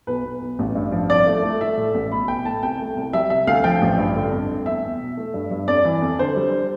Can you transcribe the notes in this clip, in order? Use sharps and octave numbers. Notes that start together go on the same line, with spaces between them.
B1 B4
B1
B1
A1
G2
F3
C2 D5
A3
A3
A3 E5
A2
A1
B1 B5
B2 G5
A3 A5
C2 G5
A3
C2
G3 E5
C3 E5
D2 F5
F3 G5
A1
G2
D3
F2
A3
E2 E5
E2
B2
A3
G2
G2
F2 D5
E3
F2
D3 C5
G3